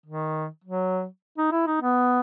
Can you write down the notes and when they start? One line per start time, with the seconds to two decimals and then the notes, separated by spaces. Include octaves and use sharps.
0.06 D#3
0.64 F#3
1.38 D#4
1.52 E4
1.67 D#4
1.81 B3